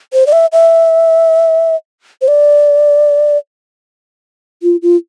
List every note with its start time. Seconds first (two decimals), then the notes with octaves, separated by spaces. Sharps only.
0.13 C5
0.27 D5
0.32 E5
0.53 E5
2.22 C5
2.28 D5
4.63 F4
4.82 F4